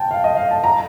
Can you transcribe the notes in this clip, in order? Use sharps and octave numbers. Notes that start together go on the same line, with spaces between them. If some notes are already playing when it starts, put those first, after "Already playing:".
Already playing: G5 A5
F5
D#5
F5
A5
A#5